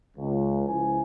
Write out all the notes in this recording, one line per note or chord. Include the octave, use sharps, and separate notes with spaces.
C#2
C#2 F3 E4 G#5